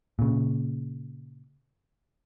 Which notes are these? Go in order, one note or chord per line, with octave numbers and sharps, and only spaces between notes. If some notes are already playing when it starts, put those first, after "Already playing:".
A#2 C#3